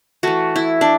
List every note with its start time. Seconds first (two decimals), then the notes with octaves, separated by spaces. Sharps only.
0.23 E3 A3 F#4
0.56 E4
0.81 D4